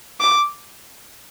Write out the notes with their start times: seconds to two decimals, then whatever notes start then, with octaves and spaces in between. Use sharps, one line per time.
0.20 D6